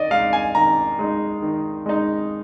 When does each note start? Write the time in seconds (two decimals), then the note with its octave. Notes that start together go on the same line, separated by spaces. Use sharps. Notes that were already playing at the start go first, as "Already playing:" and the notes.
Already playing: D#3 D5 D#5
0.11 G#3 D#4 F5
0.33 G#5
0.55 D#3 A#5
0.99 G#3 D#4
1.42 D#3
1.86 G#3 D#4